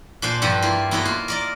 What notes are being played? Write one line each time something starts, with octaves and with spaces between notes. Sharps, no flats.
A#2 D4 C5 G#5
G2 F3 G4 A4 F#5 A#5
A#3 E4 F4
F#2 B3 E4 A4 C#5 D#5
A#3 F4
A#4 D5 D#5